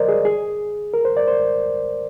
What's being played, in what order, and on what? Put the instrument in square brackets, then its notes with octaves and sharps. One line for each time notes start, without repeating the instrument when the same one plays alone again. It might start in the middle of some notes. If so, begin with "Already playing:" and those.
Already playing: [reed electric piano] A#4 C5 D5 D#5
G#4
G#4
A#4
C5
D5
C5